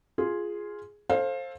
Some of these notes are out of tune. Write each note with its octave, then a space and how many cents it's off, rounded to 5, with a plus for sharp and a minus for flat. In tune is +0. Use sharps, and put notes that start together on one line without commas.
F4 +0 G#4 +0
A4 +0 C5 +25 F5 +0